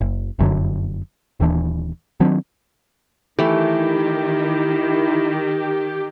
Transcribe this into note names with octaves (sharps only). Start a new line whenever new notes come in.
F#1
F1 F#2 D3 F#3
D#1 D#2 E3 D4
D#3 F#3 C4 D4
D#3 E3 A3 E4 G4